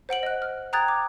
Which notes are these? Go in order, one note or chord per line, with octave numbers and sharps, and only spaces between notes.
C5 F#5 D7 F#7
D#5 F#6
F6
G5 A#5 D#6 F#6 G#6 A6
D6